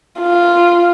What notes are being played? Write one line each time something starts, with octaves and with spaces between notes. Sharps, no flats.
F4